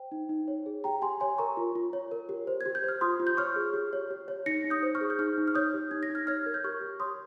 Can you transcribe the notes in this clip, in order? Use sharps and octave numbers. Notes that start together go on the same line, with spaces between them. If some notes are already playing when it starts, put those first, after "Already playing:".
Already playing: C5 G5
D#4
D#4
C#5
G#4
G4 G5 A#5
G4 G#5 C6
C#5 G#5 C6
A#4 A#5 C#6
F4
F4
C#5
A#4
G4
C5
G#6
G4
G6
C5 F6
F4 C6 D#6
F4
G6
C#5 C#6 F6
G#4
G4
C#5
G4
C#5
D#4 A#6 C#7
D#4
D#6 G6
C5
C#6 F6
G#4
G6
D#4 C#6 F6
D#4
F6
C#5 D#6 G6
G4
D#4 G#6
A#6
D#4
F6 G#6
C#5 F6 G#6
A#4
G6
G4 C#6 F6
G4
C#5 C6 D#6